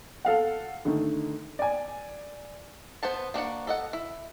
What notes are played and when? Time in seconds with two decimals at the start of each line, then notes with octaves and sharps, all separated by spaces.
0.25 A4 F5 F#5
0.85 D3 D#3 A3
1.59 D5 G#5
3.03 B3 C5 F#5 A5
3.34 A#3 D4 F#4 F#5
3.67 A4 D#5 F#5
3.93 E4